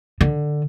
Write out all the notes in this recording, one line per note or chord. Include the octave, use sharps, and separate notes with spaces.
D3